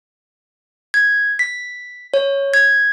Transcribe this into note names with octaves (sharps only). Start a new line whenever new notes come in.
G#6
B6
C#5
G#6